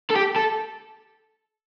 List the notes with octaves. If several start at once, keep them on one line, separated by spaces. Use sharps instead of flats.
A4
G4
A4